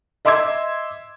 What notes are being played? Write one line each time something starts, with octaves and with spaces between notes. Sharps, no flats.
D#5 E5 C6 D6 E6 G#6